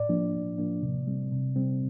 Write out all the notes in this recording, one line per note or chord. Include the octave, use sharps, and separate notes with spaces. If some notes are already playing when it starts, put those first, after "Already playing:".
Already playing: A2 D5
F3 A#3 D4
A2
F3 A#3 D4
C3
G3 C4
C3
G3 C4